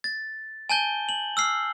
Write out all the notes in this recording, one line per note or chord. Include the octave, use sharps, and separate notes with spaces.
A6
G#5 A5 G6 G7
F#7
E6 F6 C7